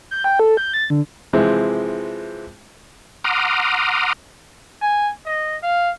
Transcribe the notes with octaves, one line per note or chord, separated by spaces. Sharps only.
G6
G5
A4
G6
A6
D3
C3 E3 F3 G#3 C4
F#5 A#5 C6 D6 D#6 F6
G#5
D#5
F5